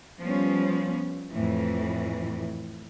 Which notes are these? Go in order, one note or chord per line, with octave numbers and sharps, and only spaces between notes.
F3 G3 B3 C#4
F2 A2 E3